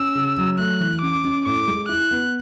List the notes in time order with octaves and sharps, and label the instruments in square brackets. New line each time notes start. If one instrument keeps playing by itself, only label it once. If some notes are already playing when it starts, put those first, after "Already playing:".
Already playing: [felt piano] C#4 [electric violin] E6
[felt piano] C#3
F#3
[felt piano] A3 [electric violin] F#6
[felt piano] E3
[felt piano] C#4 [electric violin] D6
[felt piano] C#4
[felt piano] A2 [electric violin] D6
[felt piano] G#3
[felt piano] E4 [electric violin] F#6
[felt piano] B3